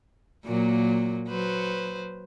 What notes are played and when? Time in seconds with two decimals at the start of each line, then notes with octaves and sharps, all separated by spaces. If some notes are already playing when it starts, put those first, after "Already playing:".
0.45 A#2 F#3 A#3
1.28 F#3 B4 C5